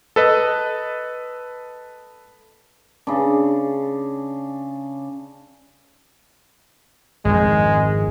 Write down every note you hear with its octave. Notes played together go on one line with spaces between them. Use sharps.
A4 B4 D#5
C#3 D4
G#1 F2 G#3